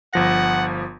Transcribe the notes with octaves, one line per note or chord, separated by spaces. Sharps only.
G1 F3 F#5 A#6